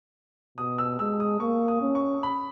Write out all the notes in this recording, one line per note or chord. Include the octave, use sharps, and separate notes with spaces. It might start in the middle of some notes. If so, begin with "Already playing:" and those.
B2 D#6
E6
G#3 E6
D#6
A#3 C#6
D#6
C#4
C#6
B5